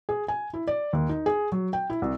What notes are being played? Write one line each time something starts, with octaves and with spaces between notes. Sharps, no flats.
G#4
G#5
E4
D5
D#2
D#4
G#4
F#3
G5
E4
C2